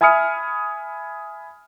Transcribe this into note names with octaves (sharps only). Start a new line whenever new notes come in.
E5 G#5 B5 D#6 F6 C#7